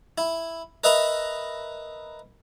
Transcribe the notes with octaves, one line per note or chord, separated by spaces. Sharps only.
E4
A#4 B4 D#5 E5 A#5 B5